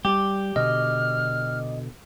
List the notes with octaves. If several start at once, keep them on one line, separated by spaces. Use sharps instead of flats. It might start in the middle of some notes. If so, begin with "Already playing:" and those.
G3 G4
B2 D3 D#5 F6